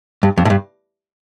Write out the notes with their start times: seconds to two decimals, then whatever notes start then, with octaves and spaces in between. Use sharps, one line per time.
0.23 G2
0.38 F2
0.45 A2
0.50 G2